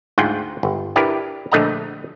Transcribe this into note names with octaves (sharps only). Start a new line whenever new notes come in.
D2 G#2 F4 F#5 G5
G1
D4 E4 G4 A#4 B4
A#1 D3 A3 D#5 F#5 A#5